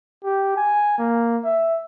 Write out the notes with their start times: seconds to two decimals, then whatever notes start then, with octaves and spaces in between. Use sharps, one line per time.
0.24 G4
0.57 G#5
0.99 A#3
1.44 E5